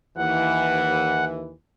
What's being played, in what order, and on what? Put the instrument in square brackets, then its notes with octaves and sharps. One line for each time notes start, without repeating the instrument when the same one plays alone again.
[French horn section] D#2 E3 [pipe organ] F#5